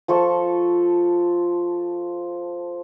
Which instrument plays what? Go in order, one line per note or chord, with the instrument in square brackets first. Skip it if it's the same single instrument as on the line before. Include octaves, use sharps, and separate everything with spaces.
[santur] F3 A4 C#6